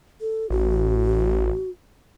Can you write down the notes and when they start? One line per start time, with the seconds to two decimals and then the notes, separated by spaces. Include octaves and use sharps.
0.21 A4
0.50 A1 F#4